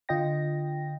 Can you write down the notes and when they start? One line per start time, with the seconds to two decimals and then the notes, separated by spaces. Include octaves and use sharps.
0.09 D3 F4 D#5 G5 A#6